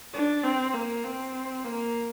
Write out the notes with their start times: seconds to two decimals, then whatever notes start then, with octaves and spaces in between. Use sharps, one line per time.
0.13 D4
0.43 C4
0.74 A#3
1.04 C4
1.64 A#3